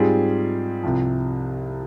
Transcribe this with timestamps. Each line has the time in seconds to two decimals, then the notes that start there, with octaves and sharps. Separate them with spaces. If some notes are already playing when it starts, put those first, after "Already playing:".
Already playing: G#2 G3 C4 F4 G#4
0.83 C2 C3 F3